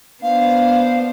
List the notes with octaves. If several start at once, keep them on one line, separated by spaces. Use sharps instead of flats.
B3 D4 C5 F5